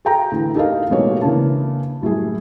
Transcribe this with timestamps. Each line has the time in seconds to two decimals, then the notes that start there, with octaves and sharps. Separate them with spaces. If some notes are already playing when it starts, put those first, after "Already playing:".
0.05 G#4 A4 G5 A#5
0.32 A2 D3 E3
0.55 D#4 G4 A4 A#4 D#5 F5
0.90 A1 B2 G#3 A#3 C#5
1.21 C#3 E3 A#3 D4 A5
2.02 F#2 A2 G3 G#4